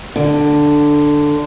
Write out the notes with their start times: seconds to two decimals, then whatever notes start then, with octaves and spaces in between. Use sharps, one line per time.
0.16 D3